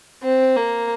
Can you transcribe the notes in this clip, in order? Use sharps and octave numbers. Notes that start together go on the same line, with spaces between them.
C4
A#3